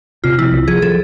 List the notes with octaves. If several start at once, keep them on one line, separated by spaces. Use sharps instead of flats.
C3 F4
F3 E4
C2
F3 G#4
F3 A4